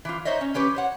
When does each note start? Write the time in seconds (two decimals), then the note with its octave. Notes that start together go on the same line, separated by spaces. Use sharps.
0.05 E3 F3 F4
0.25 D#4 C5 C#5 D#5 E5
0.41 C#4
0.54 E3 C#4 G4 B4
0.75 C5 C#5 F#5